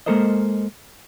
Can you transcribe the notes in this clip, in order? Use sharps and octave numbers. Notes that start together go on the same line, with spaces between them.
G#3 A#3 A4 A#4 C5 D#5